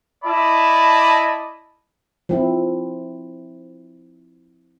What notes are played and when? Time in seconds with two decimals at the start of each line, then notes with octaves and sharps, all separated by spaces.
0.25 E4 D5 D#5 A5 B5
2.29 F3 C4 E4